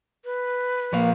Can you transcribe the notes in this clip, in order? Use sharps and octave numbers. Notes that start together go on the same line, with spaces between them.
B4
A#2 F3 A#3 F5